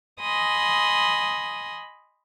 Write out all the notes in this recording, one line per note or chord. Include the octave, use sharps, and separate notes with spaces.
D#5 G#5 B5 C6 D#6